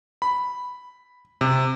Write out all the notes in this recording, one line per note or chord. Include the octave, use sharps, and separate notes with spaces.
B5
C3